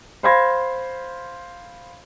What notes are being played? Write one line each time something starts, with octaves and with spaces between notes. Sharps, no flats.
C5 F5 B5 C6 G#6 A#6